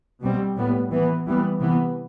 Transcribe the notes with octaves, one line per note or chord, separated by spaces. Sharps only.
B2 G3 C4
A2 G3 B3
E3 B3
E3 G3 B3
C3 E3 B3